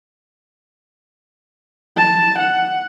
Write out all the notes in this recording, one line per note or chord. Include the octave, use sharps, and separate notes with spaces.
A5
F#5